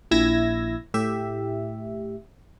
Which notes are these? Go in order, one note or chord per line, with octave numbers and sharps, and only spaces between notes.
A#1 E4 E6 G#6 A#6
A2 G4 E5